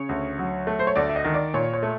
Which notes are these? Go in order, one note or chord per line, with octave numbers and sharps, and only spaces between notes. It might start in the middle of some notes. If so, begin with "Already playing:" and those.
Already playing: C#3 C#5
D2
F#3
A3
C5
C#5
D2 D5
E5
D#5
D#3
D5
A#2 C#5
C#5
A3